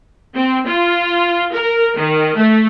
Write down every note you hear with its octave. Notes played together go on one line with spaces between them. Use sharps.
C4
F4
A#4
D#3
A3